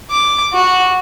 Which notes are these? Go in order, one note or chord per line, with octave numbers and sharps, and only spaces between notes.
D6
F#4